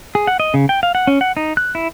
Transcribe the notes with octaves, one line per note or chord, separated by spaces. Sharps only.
G#4
F#5
D#5
C#3
G5
F5
F#5
C#4
F#5
D#4
F#6
E4